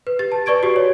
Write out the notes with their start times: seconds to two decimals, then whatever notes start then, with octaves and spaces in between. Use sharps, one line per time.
0.07 B4
0.19 G4 A6
0.32 A5
0.46 B4 D5 C#6 G#6 D7
0.63 F#4 G4
0.76 C#5